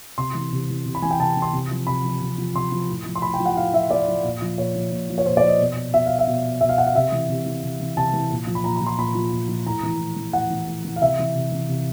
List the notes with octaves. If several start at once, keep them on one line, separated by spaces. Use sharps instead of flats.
C3 C6
E3
C3
E3
C3
B5
E3 G#5
G5
C3 A5
E3
C6
C3
F3
C3 B5
F3
C3
F3
C3 C6
F3
A2
F3
C6
A2 B5
G5
F3
F#5
A2 F5
F3 E5
A2 D5
F3
A#2
F3
A#2 C#5
F3
A#2
F3
C#5
A#2 C5
D5
F3 D#5
B2
B2 E5
F5
E5
B2
B2 E5
F5
F#5
F5
C3 E5
E3
C3
E3
C3
E3
C3 A5
E3
A#2
F3
B5
A#2 A#5
B5
F3
C6
A#2 B5
F3
A#2
F3
A2 A#5
E3
A2
E3
A2 F#5
E3
A2
E3
F5
C3 E5
E3
C3
E3
C3